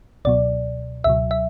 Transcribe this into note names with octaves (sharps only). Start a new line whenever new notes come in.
C#2 B2 F#3 D5
C#2 B2 F#3 E5
E5